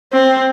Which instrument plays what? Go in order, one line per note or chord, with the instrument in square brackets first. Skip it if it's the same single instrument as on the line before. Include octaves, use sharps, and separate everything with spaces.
[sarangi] C4